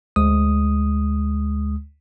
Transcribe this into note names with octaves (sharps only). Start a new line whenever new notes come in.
D2 G#3 D#6